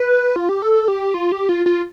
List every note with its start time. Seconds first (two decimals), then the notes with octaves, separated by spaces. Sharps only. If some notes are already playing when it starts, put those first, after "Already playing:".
Already playing: B4
0.36 F4
0.49 G4
0.62 A4
0.88 G4
1.14 F4
1.32 G4
1.49 F4
1.66 F4